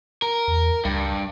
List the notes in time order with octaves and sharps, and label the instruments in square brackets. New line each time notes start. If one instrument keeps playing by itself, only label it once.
[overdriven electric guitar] A#4
[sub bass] E2
[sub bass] C#2 [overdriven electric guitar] G2